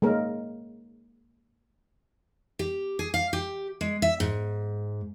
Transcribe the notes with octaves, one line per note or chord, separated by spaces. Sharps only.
G#3 A#3 A#4 C#5
G4
G#4
F5
G4
G#3
E5
G#2